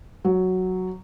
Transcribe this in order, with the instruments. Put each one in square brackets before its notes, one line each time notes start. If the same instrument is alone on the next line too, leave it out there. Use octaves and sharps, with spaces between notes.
[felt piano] F#3